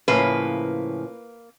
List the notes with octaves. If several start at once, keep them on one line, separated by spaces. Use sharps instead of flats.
A2 C#3 F3 A#3 B4